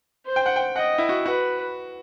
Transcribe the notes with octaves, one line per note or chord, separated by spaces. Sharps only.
C5
G5
F#5
G5
D#5 F#5
E4
F#4
F#4 B4